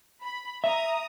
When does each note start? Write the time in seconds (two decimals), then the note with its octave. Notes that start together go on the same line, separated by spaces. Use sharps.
0.23 B5
0.64 E5 A#5 D#6